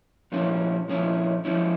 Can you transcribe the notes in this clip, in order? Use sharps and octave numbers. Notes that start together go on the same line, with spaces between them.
A#2 F3 C#4 E4
A#2 F3 C#4 E4
F3 C#4 E4